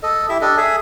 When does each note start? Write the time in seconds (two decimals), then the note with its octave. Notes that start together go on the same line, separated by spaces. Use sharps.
0.03 A4 D#5
0.29 E4 G4 E5
0.41 D4 G4 A4 D#5
0.57 G#4 A4 E5 G#5